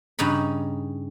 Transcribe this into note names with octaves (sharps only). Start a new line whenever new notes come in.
G2 C#3 D#4 B5